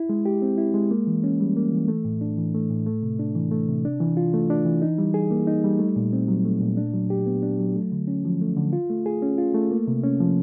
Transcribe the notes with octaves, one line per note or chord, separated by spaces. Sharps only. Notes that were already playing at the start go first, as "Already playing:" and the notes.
Already playing: E4
G#3
G4
C4
E4
G#3
A#3
E3
C#4
G3
A#3
E3
A3
A2
D4
E3
A3
A2
A3
C3
D4
E3
A3
C3
D4
E3
F4
A3
D4
E3
D#4
G3
G#4
A#3
D#4
G3
A3
A#2
C4
F#3
A3
A#2
D4
F#3
G4
B3
D4
F#3
A3
D3
C#4
F3
A3
D3
F4
A3
G#4
C#4
F4
A3
A#3
C3
C#4
F3